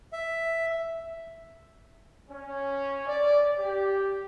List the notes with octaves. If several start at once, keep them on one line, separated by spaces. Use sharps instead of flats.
E5
C#4
D5
G4